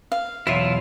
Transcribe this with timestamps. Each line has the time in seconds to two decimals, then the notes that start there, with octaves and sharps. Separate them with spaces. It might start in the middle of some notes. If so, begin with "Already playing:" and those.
0.12 F5
0.47 B1 E2 E4 F4 E5